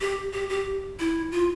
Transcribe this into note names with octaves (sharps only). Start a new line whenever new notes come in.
G4
G4
G4
E4
F4